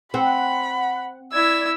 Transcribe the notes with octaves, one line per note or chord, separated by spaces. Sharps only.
C4 F#5 B5
E4 D5 E6 G#6